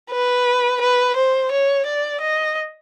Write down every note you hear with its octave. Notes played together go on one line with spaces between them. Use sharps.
B4
B4
C5
C#5
D5
D#5